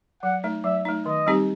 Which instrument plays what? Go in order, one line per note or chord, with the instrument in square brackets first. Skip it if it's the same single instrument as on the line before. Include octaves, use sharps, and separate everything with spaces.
[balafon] F#3 [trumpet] F#5
[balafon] A3 D#4
[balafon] F#3 [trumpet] E5
[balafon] A3 D#4
[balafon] D#3 [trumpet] D#5
[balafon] G3 C4 D#4 G4